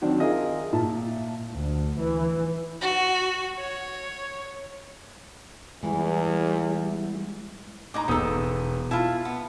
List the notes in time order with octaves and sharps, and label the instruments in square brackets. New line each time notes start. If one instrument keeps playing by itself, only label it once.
[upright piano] D#3 F#3 C4 D4
F4 G#4 A#4 D#5 E5
A#2 E5 A5
[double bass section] D2
E3
[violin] F#4
C#5
[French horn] E2 [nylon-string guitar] E3 [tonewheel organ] G3 G#3 E4
[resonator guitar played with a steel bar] A2 D#4 A#5 [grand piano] D6
[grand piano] E1 B3 D#6 [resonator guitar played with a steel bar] D#4 A4
[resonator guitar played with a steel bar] E4 F4 [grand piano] A5
[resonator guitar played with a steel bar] B3